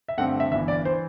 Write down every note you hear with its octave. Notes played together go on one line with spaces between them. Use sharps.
E5
G2 D3 A3 C4 F#5
E5
G1 G2 E3 E5
D5
E3 C5